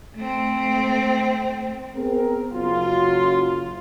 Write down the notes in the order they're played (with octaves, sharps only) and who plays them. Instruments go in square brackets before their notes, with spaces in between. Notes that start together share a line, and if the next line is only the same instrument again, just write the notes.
[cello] A3 C4
[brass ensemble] B3 C4 G#4 A#4
F#1 F#2 F#3 F4